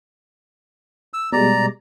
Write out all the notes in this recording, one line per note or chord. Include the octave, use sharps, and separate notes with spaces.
E6
B2 G3 G#3 D5 A#5